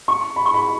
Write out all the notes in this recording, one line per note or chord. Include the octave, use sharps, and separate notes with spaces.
C#6
B5
C#6
B5